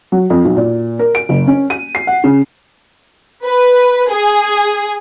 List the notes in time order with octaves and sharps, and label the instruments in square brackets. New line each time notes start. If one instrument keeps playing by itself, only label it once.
[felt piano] F#3
F2
B1
A#2
A#4
D7
F#1
C#4
D#7
C7
F#5
C#3
[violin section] B4
G#4